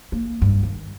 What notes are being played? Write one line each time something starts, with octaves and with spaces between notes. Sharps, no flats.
A#3
G2
D#3